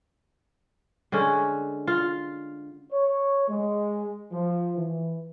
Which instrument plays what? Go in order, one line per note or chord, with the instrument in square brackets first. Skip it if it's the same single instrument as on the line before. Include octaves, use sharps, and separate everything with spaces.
[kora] D3 G#3 C#4
F4
[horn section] C#5
G#3
F3
E3